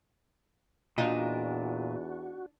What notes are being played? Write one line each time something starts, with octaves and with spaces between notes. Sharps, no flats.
E2 A#2 D4 D#4 F4 F#4